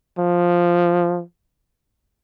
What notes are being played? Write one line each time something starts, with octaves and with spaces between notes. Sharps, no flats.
F3